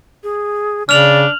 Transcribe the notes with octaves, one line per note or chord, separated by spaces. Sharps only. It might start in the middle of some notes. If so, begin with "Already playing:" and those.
G#4
C#3 D4 D5 F6 F7 F#7